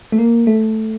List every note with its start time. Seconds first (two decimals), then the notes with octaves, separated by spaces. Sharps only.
0.12 A3
0.19 A#3
0.47 A3